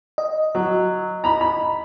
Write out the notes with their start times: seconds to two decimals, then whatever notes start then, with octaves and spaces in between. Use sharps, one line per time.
0.18 D#5
0.55 F#3
1.24 A#5 B5
1.41 B5